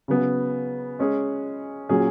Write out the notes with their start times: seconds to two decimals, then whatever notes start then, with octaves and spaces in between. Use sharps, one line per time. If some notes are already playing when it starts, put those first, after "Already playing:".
0.08 C#3 F#3 B3
0.99 G#3 C#4 G#4
1.89 A#2 F#3 C#4 G#4